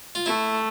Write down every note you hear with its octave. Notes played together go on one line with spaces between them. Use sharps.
F4
A3 E4